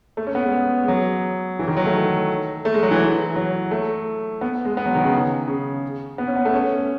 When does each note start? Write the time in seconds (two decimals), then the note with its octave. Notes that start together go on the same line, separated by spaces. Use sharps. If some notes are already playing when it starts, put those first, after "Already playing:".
0.17 A3
0.27 C#4
0.35 B3
0.44 G#3
0.83 G#3
0.88 F#3
1.59 E3
1.68 D#3
1.77 F#3
1.86 A3
2.65 A3
2.74 G#3
2.83 F#3
2.91 E3
3.36 F#3
3.71 A3
4.41 B3
4.65 G#3
4.77 B3
4.86 F#3
4.95 D#3
5.03 C#3
5.48 C#3
6.18 B3
6.28 C#4
6.36 B3
6.45 A3
6.54 C#4